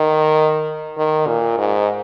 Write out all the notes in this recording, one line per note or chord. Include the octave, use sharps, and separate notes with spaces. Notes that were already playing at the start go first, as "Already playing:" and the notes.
Already playing: D#3
D#3
A#2
G#2